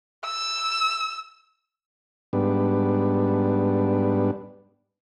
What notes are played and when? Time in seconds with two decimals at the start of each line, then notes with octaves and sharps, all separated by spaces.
0.25 E6
2.33 G#2 G3 B3 D4